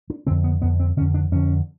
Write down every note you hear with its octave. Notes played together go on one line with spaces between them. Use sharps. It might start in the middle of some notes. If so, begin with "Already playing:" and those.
D4
F2 D3 C4
B3
F2 D3 B3
C4
F2 D3 C#4
D4
F2 D3 C#4